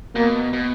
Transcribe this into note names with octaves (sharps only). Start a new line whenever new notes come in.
B2 A#3
B2